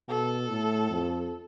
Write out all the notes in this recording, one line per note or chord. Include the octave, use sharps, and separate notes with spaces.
B2 A4
A2
F2